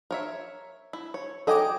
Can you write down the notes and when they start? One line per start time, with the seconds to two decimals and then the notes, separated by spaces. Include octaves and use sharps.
0.11 A#4 C#5 E5
0.93 E4
1.14 C#5
1.47 F#3 A4 D#5 G5 G#5 D6